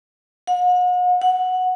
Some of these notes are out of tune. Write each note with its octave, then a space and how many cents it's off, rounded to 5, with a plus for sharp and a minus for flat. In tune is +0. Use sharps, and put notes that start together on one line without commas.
F#5 -40
F#5 -5